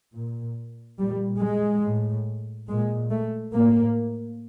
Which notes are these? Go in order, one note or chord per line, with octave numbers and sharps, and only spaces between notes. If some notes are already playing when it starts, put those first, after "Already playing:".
A#2
A#2 G3
G#3
A2
A#2 G#3
A3
A2 A#3